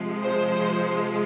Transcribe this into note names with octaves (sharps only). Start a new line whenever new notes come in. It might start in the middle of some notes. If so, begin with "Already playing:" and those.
Already playing: C3 F3 G#3
C5